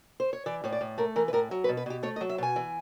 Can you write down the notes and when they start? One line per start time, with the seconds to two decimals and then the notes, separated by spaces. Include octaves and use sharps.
0.20 C5
0.33 C#5
0.46 E3 D5
0.64 A2 C#5
0.72 D5
0.81 A2
0.98 A3 A#4
1.16 E3 A#4
1.28 B4
1.33 A2 A#4
1.51 F#3
1.64 B4
1.69 B2
1.77 B4
1.86 B2 G4
2.03 A3 C#5
2.16 D#5
2.21 F#3
2.29 E5
2.38 B2 G#5
2.56 E3